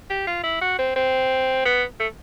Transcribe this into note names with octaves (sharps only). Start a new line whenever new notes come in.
G4
F4
E4
F#4
C4
C4
B3
A3